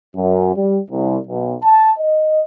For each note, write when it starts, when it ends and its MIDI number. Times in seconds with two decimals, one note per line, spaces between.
0.15 0.52 42
0.55 0.78 55
0.90 1.17 36
1.28 1.54 35
1.64 1.90 81
1.99 2.41 75